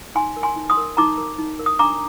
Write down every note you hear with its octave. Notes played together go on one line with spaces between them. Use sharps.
D#4 G#5 C6
A#4
G#5 C6
D#4
C6 D#6
A#4
D#4 A#5 D6
A#4
D#4
A#4
D#6
D4 A#5 D6